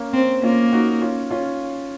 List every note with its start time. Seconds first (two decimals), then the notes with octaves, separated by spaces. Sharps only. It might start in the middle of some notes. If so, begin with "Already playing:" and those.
Already playing: A#3 C#4
0.13 C4
0.43 A#3 C#4 F4
0.73 D#4 F#4
1.01 C#4 F4
1.31 C#4 F4